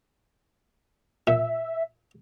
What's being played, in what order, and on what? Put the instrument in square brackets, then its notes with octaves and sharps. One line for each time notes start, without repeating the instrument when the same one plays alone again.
[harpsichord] A#2 [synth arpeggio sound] E5